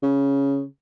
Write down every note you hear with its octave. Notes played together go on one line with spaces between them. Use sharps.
C#3